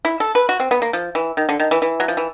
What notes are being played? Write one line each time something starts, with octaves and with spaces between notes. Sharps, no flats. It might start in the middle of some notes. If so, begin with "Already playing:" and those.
E4
A4
B4
F#4
C4
B3
A#3
F3
E3
D#3
D3
D#3
E3
E3
F#3
F3
E3